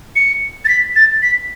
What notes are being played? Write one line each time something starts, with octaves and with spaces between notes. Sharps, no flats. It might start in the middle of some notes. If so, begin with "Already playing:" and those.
C#7
A6
B6
A6
B6